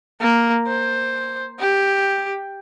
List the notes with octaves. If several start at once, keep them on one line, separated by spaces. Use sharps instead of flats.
A#3
C5
G4